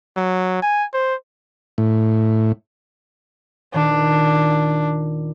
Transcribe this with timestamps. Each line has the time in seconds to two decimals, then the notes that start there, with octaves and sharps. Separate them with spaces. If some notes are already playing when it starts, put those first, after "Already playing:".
0.17 F#3
0.62 G#5
0.93 C5
1.78 A2
3.74 D#1 D#3 D4